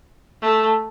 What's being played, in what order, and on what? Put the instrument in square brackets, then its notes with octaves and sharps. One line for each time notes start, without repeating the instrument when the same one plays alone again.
[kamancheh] A3